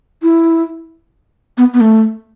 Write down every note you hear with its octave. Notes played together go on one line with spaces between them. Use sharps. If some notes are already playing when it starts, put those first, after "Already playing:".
E4
B3
B3
A3